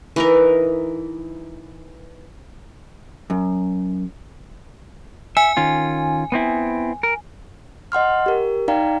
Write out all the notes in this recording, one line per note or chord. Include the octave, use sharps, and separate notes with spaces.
E3 D#4 A#4
F#2
E5 G#5
D#3 C#4 F4
B3 C4 E4
A#4
D#5 F#5 C6 F6
G4 A#4
D#4 D5 F5 G5 A#5